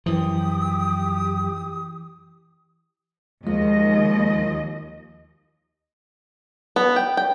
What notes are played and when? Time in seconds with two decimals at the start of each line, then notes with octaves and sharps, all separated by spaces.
0.06 F#2 E3 F3 G4 D#6
3.47 D#2 F3 G#3 D#5
6.76 B3
6.96 G5
7.17 G5